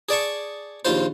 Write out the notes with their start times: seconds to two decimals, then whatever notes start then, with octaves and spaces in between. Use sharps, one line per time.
0.09 G#4 D5 A5 C#6
0.85 A#1 D#2 F4 C5